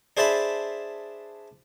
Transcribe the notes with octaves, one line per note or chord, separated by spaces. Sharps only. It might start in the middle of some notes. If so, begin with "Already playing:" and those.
D4 G#4 C5 E5 A5 B5